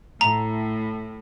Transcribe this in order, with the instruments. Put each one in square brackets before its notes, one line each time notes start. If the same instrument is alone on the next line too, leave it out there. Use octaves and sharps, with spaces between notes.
[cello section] A2 [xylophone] A#5